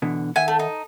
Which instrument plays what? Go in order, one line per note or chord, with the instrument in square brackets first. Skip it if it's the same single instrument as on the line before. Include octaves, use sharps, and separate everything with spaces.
[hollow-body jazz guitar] B2 D3 E3
[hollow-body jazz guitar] D#3 E5 F#5 [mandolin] G#5
[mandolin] A3
D#4